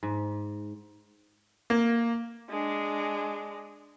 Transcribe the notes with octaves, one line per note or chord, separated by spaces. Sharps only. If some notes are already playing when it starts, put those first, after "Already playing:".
G#2
A#3
G#3 D4